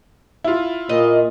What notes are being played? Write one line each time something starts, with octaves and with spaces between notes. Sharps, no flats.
E4 F4
A#2 D#5